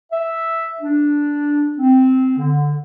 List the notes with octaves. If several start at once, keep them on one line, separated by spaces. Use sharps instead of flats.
E5
D4
C4
D3